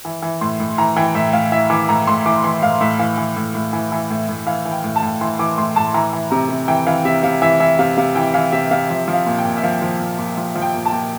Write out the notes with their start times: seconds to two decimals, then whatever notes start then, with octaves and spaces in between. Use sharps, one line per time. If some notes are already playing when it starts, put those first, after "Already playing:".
0.05 E3
0.22 E3
0.41 A2 C6
0.60 A2
0.78 E3 A#5
0.96 E3 G5
1.15 A2 E5
1.33 A2 F5
1.52 E3 E5
1.70 E3 D6
1.89 A2 A#5
2.07 A2 C6
2.26 E3 D6
2.44 E3 C6
2.63 A2 F5
2.81 A2 E5
2.99 E3 F5
3.17 E3
3.36 A2
3.55 A2
3.73 E3
3.92 E3
4.10 A2
4.29 A2
4.47 E3 F5
4.65 E3
4.71 G5
4.84 A2
4.96 A5
5.02 A2
5.21 E3 C6
5.39 E3 D6
5.57 A2 C6
5.76 A2 A5
5.94 E3 A#5
6.13 E3
6.31 C3 A#5
6.49 C3
6.68 E3 G5
6.87 E3 F5
7.05 C3 E5
7.23 C3 F5
7.42 E3 E5
7.60 E3 E5
7.79 C3 F5
7.97 C3 F5
8.15 E3 G5
8.34 E3 F5
8.52 C3 E5
8.71 C3 F5
8.90 F3 E5
9.08 F3
9.14 F5
9.26 A#2
9.38 G5
9.45 A#2
9.57 E5
9.63 F3 F5
9.82 F3
10.00 A#2
10.18 A#2
10.37 F3
10.55 F3
10.62 G5
10.74 A#2
10.86 A5
10.92 A#2